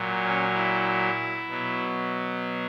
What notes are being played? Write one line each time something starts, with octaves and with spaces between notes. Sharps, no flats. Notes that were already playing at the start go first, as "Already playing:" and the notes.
Already playing: A#2 F#3
C#4
E4
B2 F#3